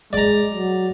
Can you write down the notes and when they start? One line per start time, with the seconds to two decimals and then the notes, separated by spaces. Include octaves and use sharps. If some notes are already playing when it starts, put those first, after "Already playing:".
0.13 G#3 D5 A#5
0.52 F#3